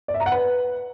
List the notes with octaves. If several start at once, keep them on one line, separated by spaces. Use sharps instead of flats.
D5
E5
A#5
F#5
B4